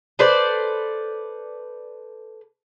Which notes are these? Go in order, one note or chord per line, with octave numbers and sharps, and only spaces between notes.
A4 B4 C5 D5